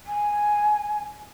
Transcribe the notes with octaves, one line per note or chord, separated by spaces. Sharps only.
G#5